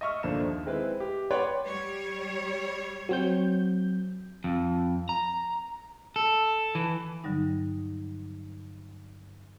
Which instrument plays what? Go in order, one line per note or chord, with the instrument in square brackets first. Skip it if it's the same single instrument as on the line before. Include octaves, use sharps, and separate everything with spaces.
[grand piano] D#5 E5 C#6 F6
A#1 D3 F3 A#3 E7
D#2
G#3 C4 E4 B4
G4
B4 C#5 D5 F#5 G5 C6
[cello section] G3 C#5
[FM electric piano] F#3 C4 G6
[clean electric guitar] F2
A#5
A4
E3
[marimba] G2 D3 F#3 G3 D#4